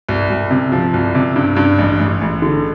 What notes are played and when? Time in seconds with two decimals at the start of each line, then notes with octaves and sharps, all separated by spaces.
0.09 C2
0.30 C2
0.51 C3
0.72 F3
0.94 C2
1.15 C3
1.36 G2
1.56 G2
1.78 A1
1.99 A1
2.21 A1
2.42 D3